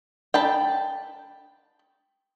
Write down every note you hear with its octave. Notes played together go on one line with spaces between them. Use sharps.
G5 A5 B5